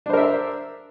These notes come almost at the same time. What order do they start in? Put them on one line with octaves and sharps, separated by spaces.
D4 C5 A#4 E5